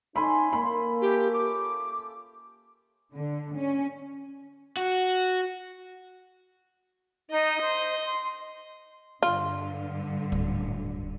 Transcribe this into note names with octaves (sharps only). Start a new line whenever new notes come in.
A3 C#4 D#4 G#5 B5 C6
A#3 B5
A3 F4 G4
D6
D3
C#4
F#4
D#4 D#5
C5
C6
G2 D3 F4
D1